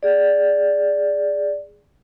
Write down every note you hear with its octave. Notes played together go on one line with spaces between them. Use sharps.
G#4 D5